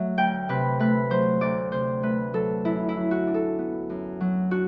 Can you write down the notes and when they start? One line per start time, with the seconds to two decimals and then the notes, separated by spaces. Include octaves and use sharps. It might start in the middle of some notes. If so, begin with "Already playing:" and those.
Already playing: F#3 A3 E5
0.18 D2 G5
0.49 C3 B4
0.79 A3 B4
1.10 F#3 C5
1.41 D2 D5
1.72 C3 C5
2.03 A3 B4
2.33 F#3 A4
2.65 F#2 E4
2.89 E4
2.97 F#3
3.11 F#4
3.27 D4
3.34 A4
3.59 B3
3.90 F#2
4.21 F#3
4.51 D4 F#4